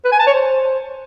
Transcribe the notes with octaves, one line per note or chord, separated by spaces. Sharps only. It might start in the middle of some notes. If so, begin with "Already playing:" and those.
B4
G#5
A5
C#5
C5